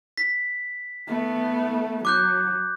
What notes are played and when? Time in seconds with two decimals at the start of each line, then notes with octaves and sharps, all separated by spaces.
0.18 B6
1.08 A3 B3
2.05 F#3 D6 F#6 G6